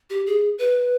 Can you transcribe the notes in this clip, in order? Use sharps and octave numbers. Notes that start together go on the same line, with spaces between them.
G4
G#4
B4